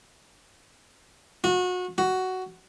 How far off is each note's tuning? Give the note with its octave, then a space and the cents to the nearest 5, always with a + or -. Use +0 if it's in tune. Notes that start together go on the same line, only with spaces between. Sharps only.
F#4 -30
F#4 +10